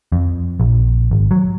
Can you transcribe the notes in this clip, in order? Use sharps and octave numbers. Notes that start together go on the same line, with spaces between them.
F2
A#1
G#1
F#3